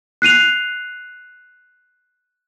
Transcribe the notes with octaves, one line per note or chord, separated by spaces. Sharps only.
F#6 C7 D#7 F7